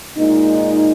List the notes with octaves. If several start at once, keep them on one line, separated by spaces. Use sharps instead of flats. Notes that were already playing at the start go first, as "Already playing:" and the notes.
A#2 G#3 D#4